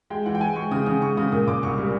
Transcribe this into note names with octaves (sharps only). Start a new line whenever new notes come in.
G#3 G5
E3 F#5
G5
G#3 G#5
G#3 C#6
C#3 D#6
C#3 D#6
G#3 C#6
C#3 D#6
A#2 D#6
A#2 D6
C2 C#6
G3